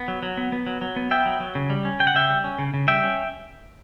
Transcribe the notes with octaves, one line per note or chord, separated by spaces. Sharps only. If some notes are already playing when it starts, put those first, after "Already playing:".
Already playing: B3
F#3
F#3
B3
B3
F#3
F#3
B3
B3 E5 G5
F#3
F#3
C#3
G3
C#4
C#3 G5
F#5
C#3 E5 G5
G3
C#4
C#3
C#3
G3 E5 G5
C#4